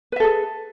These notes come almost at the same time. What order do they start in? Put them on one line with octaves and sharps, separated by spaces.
B4 E5 A4 G#4